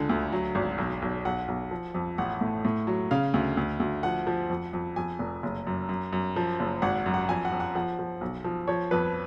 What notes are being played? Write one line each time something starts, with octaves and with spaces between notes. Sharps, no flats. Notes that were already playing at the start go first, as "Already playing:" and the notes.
Already playing: C#2 D3 G#5
D2
F#3
G#1
B1
B1
B1 F#5
B1
F3
F2
A1 F#5
A2
A2
F#3
C#3 F5
D2
D2
D2
F3 F#5
F3
F2
F2
F2 G#5
F1
F#1
F#2
F#2
F#2
F3
F#1
G#1 F#5
F#2
F#5
F2 G#5
F#5
F2
F#5
F3 F#5
F3
B1
F3
F3 C#5
F2 B4